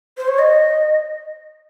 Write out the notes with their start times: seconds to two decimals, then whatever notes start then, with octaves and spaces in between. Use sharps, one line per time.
0.18 C5
0.28 C#5
0.39 D#5